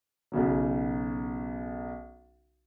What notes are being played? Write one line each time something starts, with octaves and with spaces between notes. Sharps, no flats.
B1 C#3 F#3